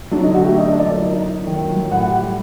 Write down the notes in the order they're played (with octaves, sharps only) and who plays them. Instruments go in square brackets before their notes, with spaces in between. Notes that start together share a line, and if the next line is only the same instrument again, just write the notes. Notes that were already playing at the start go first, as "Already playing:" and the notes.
[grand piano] F#3 [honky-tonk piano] D4
[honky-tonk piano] D#4
[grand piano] D3
[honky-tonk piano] F#4
[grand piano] A3 [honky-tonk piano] G4
[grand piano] D4 [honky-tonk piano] D#5
[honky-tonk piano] D#5
[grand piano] D4
[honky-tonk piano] D5
[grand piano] F#3 [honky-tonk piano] A#4
[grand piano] D#4
D#4
D#4
D#3
F#3
F#3
[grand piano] A2 [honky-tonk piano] F#5
[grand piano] G4
G3